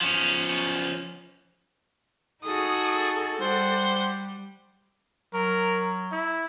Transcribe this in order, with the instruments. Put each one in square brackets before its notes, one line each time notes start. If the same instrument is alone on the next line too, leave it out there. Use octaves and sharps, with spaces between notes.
[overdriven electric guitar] F3 C#4
[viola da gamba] D#4 F#4 G#4 [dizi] A4 [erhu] D#6
[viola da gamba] G3 [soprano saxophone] C5 [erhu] F#5
[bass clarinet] F#3 [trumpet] A#4
[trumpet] E4